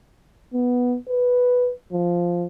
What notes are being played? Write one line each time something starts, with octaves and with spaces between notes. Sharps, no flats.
B3
B4
F3